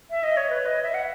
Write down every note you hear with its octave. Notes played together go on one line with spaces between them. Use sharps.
E5
D#5
C#5
B4
D#5
E5
F#5